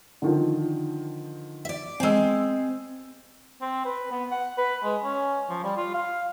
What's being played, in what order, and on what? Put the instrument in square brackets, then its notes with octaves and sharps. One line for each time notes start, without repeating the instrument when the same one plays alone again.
[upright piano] D3 D#3 F3
[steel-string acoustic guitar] D5 E5
[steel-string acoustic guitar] G#3 C4 [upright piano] G#5 E6
[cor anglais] C4
B4
B3
F#5
B4
G#3
C#4
F3
G3
F4
F5